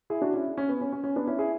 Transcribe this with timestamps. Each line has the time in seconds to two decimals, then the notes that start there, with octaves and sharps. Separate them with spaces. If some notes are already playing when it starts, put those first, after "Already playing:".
0.10 E4 G#4
0.22 D4 F#4
0.33 C#4 E4
0.58 C#4
0.69 B3
0.81 C#4
0.93 C#4
1.04 C#4
1.16 B3 D4
1.27 C#4 E4
1.38 E4 G#4